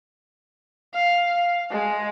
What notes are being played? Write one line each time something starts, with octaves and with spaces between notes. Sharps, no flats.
F5
G#3